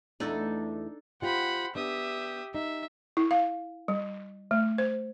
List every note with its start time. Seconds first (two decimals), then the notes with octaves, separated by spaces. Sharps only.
0.20 E2 A3 D4 D#4 A4
1.22 F4 G4 C5 F#5 B5
1.75 B3 D4 G4 E5 D#6
2.54 D#4 E5
3.17 E4
3.31 F5
3.88 G3
4.51 A3
4.78 C5